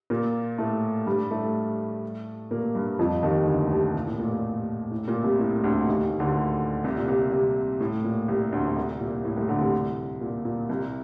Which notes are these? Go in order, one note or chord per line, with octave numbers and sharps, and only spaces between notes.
A#2 A#3
A2 A3
G2 G3
A2 A3
A#2 A#3
G2 G3
F2 F3
D#2 D#3
D2 D3
C2 C3
A#2
A2
A#2
A#2
A2
A#2
C2 C3
A2
D2 D3
D#2 D#3
D2 D3
C2 C3
A#2
C2 C3
C2 C3
A2
A#2
C2 C3
D2 D3
C2 C3
A#2
A2
C2 C3
D2 D3
C2 C3
A#2
A#2
C2 C3